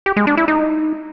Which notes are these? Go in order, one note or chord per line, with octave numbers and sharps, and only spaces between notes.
G4
G#3
D4
E4
D#4